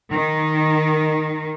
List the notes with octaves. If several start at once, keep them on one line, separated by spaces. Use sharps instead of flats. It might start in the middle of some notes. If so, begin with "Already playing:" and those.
D#3